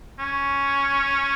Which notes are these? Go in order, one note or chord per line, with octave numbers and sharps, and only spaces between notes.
C#4